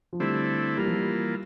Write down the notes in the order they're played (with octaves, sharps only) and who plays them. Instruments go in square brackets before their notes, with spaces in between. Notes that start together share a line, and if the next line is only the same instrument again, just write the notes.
[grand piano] F3
[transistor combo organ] D3 A3 C4 E4 [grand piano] G3
[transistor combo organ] E3 A#3 F4 [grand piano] G3
[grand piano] F3
G3